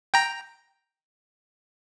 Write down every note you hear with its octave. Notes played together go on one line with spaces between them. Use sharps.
G5 A#5